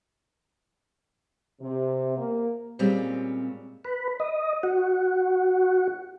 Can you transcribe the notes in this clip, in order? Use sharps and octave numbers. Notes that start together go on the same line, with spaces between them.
C3
A#3
A#2 G3 G#3 C4 C#4
B4
D#5
F#4